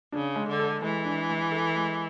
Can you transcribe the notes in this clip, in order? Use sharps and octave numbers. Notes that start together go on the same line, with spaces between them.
C#3 D4
G#3
D3
A4
E3 G#3
D4
G#3
A4
G#3